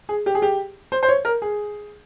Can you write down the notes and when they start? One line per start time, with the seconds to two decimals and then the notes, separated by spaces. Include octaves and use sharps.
0.09 G#4
0.26 G4
0.35 G#4
0.42 G4
0.92 C5
1.03 C5
1.09 C#5
1.25 A#4
1.42 G#4